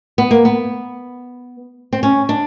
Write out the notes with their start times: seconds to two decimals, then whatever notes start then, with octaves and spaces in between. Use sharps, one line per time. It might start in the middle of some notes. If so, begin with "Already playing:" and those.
0.18 B3
0.31 A#3
0.45 B3
1.93 C4
2.03 C#4
2.29 D4